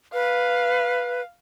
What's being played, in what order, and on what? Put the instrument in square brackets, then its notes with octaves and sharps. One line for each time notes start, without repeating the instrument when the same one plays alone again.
[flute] B4 [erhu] F5